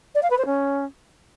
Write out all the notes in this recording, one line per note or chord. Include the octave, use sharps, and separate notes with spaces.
D5
F5
B4
C5
C#4